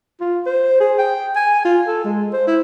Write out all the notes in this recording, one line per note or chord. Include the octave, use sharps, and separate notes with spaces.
F4
C5
G#4
G5
G#5
F4
A4
G#3
C5
E4